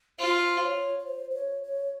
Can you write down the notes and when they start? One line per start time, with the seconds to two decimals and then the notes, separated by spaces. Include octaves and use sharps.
0.19 F4 C5
0.63 C#5
0.99 C#5
1.06 C5
1.30 C5
1.35 C#5
1.63 C#5